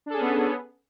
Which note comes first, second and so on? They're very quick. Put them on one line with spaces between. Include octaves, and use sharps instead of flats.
D4 A4 G#4 C#4 B3